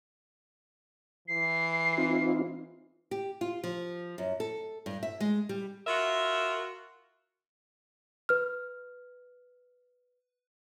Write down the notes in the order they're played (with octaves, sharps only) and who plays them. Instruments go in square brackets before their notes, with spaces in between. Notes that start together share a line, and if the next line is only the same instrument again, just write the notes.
[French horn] E3 [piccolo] C7
[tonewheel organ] C4 D#4 F4
[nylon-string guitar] G4
F4
F3
F#2
A4
G2
E5
G#3
G3
[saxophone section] F4 F#4 A#4 E5
[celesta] B4 F6